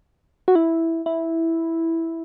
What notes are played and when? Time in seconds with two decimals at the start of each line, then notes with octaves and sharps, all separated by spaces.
0.48 F#4
0.55 E4
1.06 E4